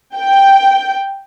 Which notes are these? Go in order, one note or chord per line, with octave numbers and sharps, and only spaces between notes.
G5